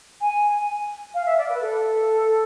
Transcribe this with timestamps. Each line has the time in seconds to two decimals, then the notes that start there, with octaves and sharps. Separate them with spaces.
0.21 G#5
1.14 F5
1.26 E5
1.38 D5
1.49 B4
1.61 A4